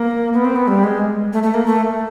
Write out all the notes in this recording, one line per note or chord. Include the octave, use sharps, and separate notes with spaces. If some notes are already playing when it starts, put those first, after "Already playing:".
Already playing: A#3
B3
C4
B3
G3
G#3
A3
A3
A#3
A3